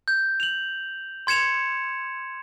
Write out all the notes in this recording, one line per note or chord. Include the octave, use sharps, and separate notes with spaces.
G6
F7 F#7
C6 G#6 C#7 E7 F7